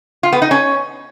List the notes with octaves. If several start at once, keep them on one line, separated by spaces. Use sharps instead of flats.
F4
B3
D#4
C#4